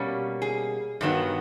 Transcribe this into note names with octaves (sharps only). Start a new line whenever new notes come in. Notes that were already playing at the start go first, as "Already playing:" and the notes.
Already playing: B2 G3 A#3 C#4
G#4
G2 D#3 F#3 B3